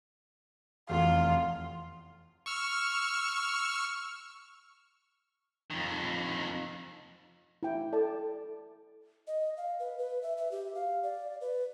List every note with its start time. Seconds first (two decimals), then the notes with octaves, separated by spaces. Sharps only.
0.89 F1 E2 F4
2.46 C#6 E6 F6
5.71 F2 D#3
7.63 E4 G5
7.93 A4 D5 A5
9.27 D#5
9.57 F5
9.79 B4
9.98 B4
10.23 E5
10.37 E5
10.51 G4
10.75 F5
11.03 D5
11.41 B4